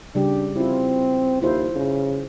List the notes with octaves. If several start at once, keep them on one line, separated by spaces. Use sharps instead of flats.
C#3 G3 D4 G4
C4 E4 F4
D#2 E4 F4 C5
C#3